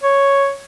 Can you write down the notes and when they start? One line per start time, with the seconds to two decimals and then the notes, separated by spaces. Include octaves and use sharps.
0.03 C#5